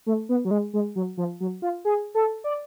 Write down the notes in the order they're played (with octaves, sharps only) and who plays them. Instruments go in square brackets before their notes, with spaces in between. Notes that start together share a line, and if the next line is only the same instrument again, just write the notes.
[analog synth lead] A3
B3
F#3
G#3
G#3
F#3
F3
F#3
F4
G#4
A4
D5